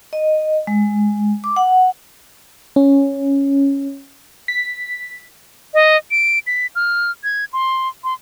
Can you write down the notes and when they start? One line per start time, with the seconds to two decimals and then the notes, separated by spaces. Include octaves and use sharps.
0.13 D#5
0.67 G#3
1.44 D6
1.56 F#5
2.76 C#4
4.48 B6
5.74 D#5
6.11 D7
6.47 B6
6.75 F6
7.24 G#6
7.53 C6
8.04 C6